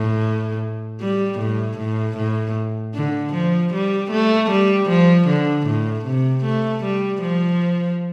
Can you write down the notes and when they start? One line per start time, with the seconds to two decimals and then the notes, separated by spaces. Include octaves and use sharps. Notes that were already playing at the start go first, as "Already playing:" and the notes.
Already playing: A2
1.00 G3
1.39 A2
1.78 A2
2.17 A2
2.95 D3
3.34 F3
3.74 G3
4.11 A3
4.50 G3
4.89 F3
5.28 D3
5.67 A2
6.06 C3
6.45 A3
6.84 G3
7.22 F3